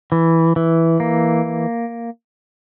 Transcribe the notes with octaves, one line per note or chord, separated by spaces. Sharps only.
E3
E3
A#3